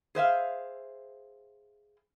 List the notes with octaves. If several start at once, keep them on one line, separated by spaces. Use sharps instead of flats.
G#4 C5 E5 F5